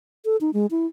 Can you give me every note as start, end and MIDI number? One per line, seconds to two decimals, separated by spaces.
0.25 0.37 69
0.41 0.51 63
0.54 0.66 56
0.71 0.86 64